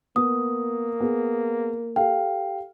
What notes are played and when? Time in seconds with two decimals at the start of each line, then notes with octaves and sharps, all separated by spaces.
0.16 A#3 B3 D#6
1.01 B3 G#4
1.96 G4 A4 F5 G5